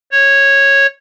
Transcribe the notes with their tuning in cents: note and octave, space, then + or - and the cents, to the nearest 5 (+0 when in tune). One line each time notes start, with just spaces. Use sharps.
C#5 -10